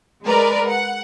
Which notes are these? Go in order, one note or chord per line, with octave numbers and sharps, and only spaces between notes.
G#3 A#4 B4 D5
F#5